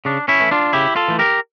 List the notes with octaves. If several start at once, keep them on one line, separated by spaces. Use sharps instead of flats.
C#3 D4
C#4 E4
E3 A3
D4 F4
C#3 E4 G4
F4 A4
E3 A3
G4 A#4